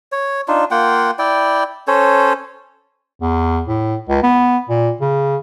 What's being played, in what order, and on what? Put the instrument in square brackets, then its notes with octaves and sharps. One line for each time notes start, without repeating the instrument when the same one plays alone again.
[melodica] C#5
D4 D#4 F4
A#3 F4 F#5 G5
E4 D5 G5
C#4 A4 C5 C#5
[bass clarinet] E2
A2
C#2
B3
A#2
C#3